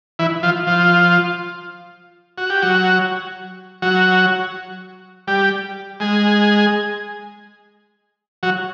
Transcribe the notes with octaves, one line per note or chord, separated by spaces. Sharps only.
E3 E4
F3 F4
F3 F4
F#4
G4
F#3 F#4
F#3 F#4
G3 G4
G#3 G#4
F#3 F#4